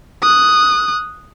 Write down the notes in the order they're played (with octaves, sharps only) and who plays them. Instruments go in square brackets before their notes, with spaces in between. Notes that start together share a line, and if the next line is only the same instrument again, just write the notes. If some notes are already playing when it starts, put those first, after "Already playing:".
[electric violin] D#6 F#6